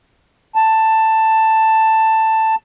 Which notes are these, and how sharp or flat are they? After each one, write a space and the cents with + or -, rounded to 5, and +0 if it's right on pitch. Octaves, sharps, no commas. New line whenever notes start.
A5 +10